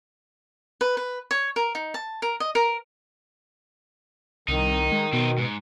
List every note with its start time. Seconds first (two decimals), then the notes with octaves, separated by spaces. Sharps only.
0.81 B4
0.97 B4
1.31 C#5
1.56 A#4
1.75 D#4
1.94 A5
2.22 A#4
2.40 D#5
2.55 A#4
4.48 C2 D#3 D#4
4.92 G#3
5.13 B2 C4 D#4
5.38 G#2